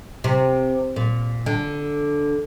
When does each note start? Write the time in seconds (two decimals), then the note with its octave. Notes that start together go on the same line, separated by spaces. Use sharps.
0.24 C3
0.96 A#2
1.46 D3